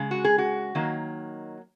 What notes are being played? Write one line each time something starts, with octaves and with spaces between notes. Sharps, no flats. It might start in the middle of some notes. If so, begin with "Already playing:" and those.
Already playing: C#3 G#3
F#4
G#4
F#4
D#3 F#3 A#3